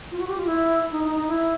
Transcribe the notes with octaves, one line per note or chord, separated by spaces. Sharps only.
F4
F#4
G4
F4
E4
D#4
D#4
D#4
E4